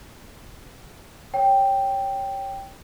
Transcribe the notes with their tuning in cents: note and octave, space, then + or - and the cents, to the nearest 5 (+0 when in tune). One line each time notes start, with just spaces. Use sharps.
C#5 +0 G5 +0